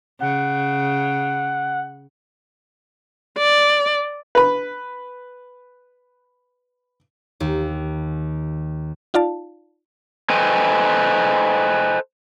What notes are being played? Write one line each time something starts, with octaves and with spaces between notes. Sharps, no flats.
C#3 F#5
D5
B4 B5
D#2
D#4 F4 D5 F5 A5
A4 B4 C5 D#5 G5 G#5